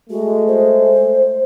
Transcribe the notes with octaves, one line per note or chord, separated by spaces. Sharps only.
G#3 A3 F#4
C5